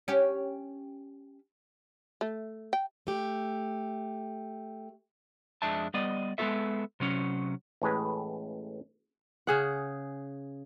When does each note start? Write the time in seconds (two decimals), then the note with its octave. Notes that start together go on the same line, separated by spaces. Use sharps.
0.08 C#4 G4
2.21 A3
2.73 G5
3.07 A3 G4
5.62 F2 G#3 D4 E5 A5
5.94 G3 B3 D5 D#5
6.38 G#3 B3 D4 F4 A4 E5
7.00 C3 F#3 C#4
7.82 A1 A2 G#3 B4
9.47 C#3 G#4 F#5